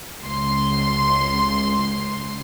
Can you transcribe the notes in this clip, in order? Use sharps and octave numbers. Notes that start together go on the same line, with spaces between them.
C#2 C6